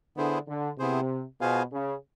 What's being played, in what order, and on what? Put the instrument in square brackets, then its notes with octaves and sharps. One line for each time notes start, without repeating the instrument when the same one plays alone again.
[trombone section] D3 [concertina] B3 E4 G#4 C5
[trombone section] D3
[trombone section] C3 [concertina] B3 E4 G#4 C5
[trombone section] B2 [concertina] F4 G#4 C5 F5 G#5
[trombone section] C#3